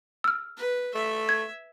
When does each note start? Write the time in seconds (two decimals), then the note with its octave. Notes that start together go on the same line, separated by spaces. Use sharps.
0.24 E6 F6
0.58 B4
0.95 A3 E5
1.29 G#6